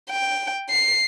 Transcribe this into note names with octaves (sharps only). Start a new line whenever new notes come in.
G5
C7